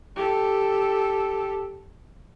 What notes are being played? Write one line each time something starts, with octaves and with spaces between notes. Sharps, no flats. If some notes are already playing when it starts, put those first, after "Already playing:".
G4 A4